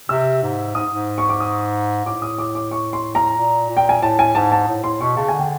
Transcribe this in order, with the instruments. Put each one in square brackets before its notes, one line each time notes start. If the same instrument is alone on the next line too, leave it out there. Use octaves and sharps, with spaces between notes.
[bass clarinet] C3 [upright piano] E6
[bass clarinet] G#2
[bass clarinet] G#2 [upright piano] D#6
[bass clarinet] G#2
[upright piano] C#6
D6
D#6
[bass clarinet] A2 [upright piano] D6
[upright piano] D#6
D6
D6
C#6
C6
A#5
[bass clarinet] A#2
A#2
[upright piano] G5
G#5
[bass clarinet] A2 [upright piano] A5
[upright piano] G#5
[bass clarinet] G#2 [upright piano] A5
[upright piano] A5
[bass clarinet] A2
[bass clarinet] A2 [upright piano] C6
[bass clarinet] B2 [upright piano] C#6
[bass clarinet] C#3 [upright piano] A5
[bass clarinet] D3 [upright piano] G#5
[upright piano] G5